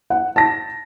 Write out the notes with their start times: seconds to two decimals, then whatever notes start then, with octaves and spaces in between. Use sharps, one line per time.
0.10 F#5
0.36 A5 A#6